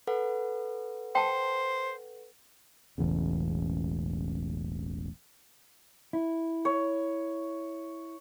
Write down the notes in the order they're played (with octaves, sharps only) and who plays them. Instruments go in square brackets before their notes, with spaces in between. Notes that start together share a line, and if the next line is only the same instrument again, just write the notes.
[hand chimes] A4 B4 F#5
[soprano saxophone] C5 [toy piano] G5 A5
[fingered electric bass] E1 A1 E2 C#3
[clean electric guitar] E4
[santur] C#5